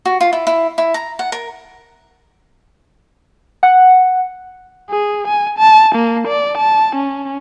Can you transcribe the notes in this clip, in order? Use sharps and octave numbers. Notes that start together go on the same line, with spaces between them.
F#4
F4
E4
E4
E4
A#5
F#5
A#4
F#5
G#4
G#5
A5
A#3
D5
A5
C#4